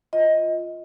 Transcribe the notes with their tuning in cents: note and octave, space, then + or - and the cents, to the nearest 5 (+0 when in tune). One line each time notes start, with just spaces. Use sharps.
F4 +0 D#5 +15